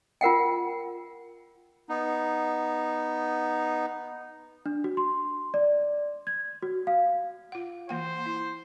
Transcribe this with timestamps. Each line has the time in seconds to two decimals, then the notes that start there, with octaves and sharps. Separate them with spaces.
0.21 F4 A#4 F#5 G5
1.89 B3 D#4
4.66 D4
4.84 F#4
4.97 C6
5.54 D5
6.27 G#6
6.62 F#4
6.87 F5
7.52 F4 F#5
7.89 E3 A#3 C5 G5
8.26 E4